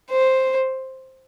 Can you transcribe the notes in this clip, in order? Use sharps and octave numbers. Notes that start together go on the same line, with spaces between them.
C5